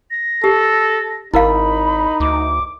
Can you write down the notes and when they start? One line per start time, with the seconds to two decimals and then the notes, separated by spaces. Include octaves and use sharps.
0.11 A#6
0.44 G4 A4
1.34 G#1 D#4 E4 A#4 F5 B5
2.20 D2 D6